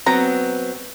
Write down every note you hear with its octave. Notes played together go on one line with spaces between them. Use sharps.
F#3 B3 C4 A#5